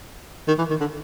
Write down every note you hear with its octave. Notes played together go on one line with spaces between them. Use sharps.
D#3
E3
D#3
D3